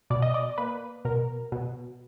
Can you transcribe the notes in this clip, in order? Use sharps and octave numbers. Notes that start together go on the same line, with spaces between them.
B2 D5
D#5
D5
A#3 B4
B2 A#4
B2